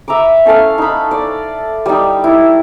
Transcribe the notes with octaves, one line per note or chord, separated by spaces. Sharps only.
E5 A#5 B5 D6
C#4 A4 C#5 F5
D#4 B5
D5
G3 D#4
E4